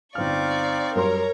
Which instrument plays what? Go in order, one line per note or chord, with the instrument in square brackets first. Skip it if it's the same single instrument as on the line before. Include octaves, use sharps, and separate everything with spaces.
[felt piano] G1 F6 [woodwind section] C4 D#4 F5 [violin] D5 C#6
[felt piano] F#2 G3 C6 [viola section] A#4 [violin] C#5 A#5